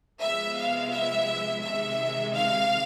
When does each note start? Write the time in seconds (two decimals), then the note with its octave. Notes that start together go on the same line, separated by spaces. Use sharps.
0.21 C3 F3 G#3 B3 E5
0.57 F5
0.92 E5
1.63 C3 D#3 G#3 E5
2.34 F5